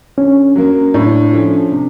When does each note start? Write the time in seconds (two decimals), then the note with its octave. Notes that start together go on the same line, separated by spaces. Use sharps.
0.17 D3 C#4
0.56 F#3 A#3
0.94 A2 D4
1.33 F3 A3 C#4
1.72 C3